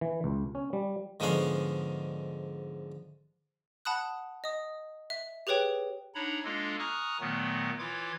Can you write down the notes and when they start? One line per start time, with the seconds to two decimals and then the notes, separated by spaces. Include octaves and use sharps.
0.01 E3
0.24 C#2
0.55 C#4
0.73 G3
1.20 G#2 D3 F3 B3 C#4 F5
3.85 F#5 A5 B5 D#6 F#6
4.44 D#5 D#6
5.10 E5
5.47 G4 G#4 B4 C#5 G5
6.15 D4 D#4 C#5 F#5 A#5 B5
6.44 G#3 A#3 D4 F4 A4 D#5
6.79 G#5 A#5 C#6 D#6 F6 F#6
7.20 A#2 D#3 F#3 A3 B3
7.79 E3 E4 F4 C#5 D6 G#6